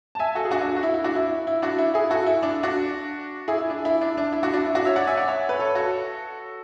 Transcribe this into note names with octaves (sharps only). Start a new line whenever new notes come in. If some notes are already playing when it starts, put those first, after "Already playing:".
A5
E5 G#5
F#4 A4
G#4
D4 F#4
D4 F#4
F#4
E4
E4
D4 F#4
E4
E4
D4 F#4
E4
E4 G#4
F#4 A4
E4
D4
D4 F#4
E4 G#4
E4
D4
E4
D4
D4
E4
D4 F#4
D4
E4
D4 F#4
C#5 E5
D5 F#5
E5 G#5
D5 F#5
C#5 E5
B4
A4 C#5
F#4 A4